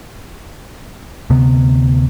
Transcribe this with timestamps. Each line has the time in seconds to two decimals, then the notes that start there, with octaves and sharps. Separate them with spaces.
1.30 D2 C3 B3